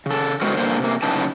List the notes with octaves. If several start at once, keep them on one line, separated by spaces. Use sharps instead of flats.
C#3 A4
D3 G#3 B3 F#4 A#4 C5
G2 D3 A#3 C5
C3 A#3
F#2 A2 C#3 D#4 B4 A5